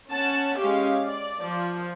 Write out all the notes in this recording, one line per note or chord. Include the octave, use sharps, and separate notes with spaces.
C#4 F#5 A5
G#3 C#4 G4 F5
D5
F3